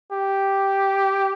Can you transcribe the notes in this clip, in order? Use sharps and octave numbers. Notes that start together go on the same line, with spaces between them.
G4